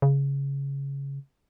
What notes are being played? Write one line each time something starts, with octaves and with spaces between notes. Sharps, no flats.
C#3